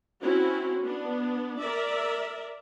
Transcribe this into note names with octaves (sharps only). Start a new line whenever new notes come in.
C4 C#4 E4 F#4
B3 D4
A#4 D5 E5